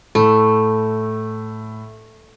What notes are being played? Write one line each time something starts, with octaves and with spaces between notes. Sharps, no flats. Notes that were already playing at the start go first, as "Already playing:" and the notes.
A2 A3